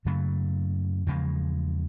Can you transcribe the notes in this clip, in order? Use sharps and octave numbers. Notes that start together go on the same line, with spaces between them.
F#2 C#3 F#3 A3
E2 C#3 F3 G#3